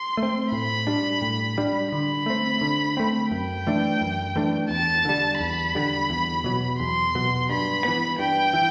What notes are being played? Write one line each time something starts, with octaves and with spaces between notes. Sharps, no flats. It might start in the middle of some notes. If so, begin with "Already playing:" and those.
Already playing: C6
A3
C4
A2 B5
G3 D4
A2
G3 D4
D3 B5
A3 C4
D3
A3 C4
F#2 G5
E3 A3 D4
F#2
E3 A3 D4
E2 A5
D3 G3
E2 B5
D3 G3
E2
B2 F#3
E2 C6
B2 F#3
G2 B5
E3 B3
G2 G5
E3